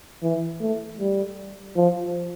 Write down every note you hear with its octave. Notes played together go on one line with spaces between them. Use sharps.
E3
A3
G3
F3